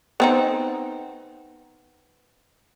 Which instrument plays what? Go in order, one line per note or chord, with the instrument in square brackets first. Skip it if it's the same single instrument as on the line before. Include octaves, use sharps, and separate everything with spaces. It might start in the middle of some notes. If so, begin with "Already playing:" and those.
[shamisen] B3 C4 D#4